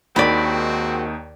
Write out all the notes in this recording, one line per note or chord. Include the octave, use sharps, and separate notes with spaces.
D#2 D#3 G#3 C4 F#4 D5 B5